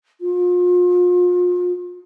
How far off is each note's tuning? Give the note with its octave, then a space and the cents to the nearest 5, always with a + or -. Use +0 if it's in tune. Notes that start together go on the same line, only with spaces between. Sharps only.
F4 +35